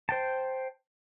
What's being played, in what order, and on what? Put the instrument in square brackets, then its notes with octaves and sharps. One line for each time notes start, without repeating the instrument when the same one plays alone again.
[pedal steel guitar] C5 G5 A5